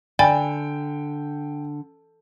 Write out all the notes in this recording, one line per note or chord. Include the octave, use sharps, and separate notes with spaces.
D3 D5 G5 G#5 B5